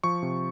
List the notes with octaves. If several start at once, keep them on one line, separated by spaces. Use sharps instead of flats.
F3 C#6
C3